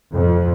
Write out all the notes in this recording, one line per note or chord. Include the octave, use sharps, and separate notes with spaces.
F2